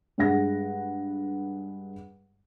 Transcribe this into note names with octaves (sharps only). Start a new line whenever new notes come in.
G2 G#3 F#5 A#6